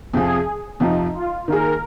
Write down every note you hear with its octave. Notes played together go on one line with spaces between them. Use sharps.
F2 C3 F3 G#4
F2 C3 F3 D#4
F4
D#3 A#3 G#4 A#4